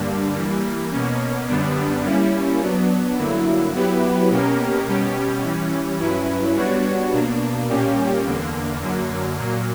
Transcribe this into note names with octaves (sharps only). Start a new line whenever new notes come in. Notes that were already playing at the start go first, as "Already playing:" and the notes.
Already playing: G2 D3 G3 A#3 D4
E3 G3 A#3
B2 A#3 C#4
F#2 D3 G3 B3 D4
G3 A#3 C#4 E4
F#3 B3 D4
G2 D3 F#3 A#3 E4
F#3 B3 E4 G4 B4
B2 A#3 C#4 G4 A#4
B2 G3 C#4 G4
E3 G3 C#4
G2 F#3 C#4 E4 B4
G3 B3 D4 F#4 C#5
B2 A#3 D4
A#2 G3 A#3 C#4 G4
E2 D3 A#3
F#2 D3 F#3 A#3
A#2 F#3 A#3